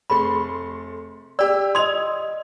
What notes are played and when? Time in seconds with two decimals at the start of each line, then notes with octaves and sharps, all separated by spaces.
0.10 F1 A3 G#4 B5 C6
1.39 G4 D5 E6
1.75 D#5 C6 D#6 G#6 F7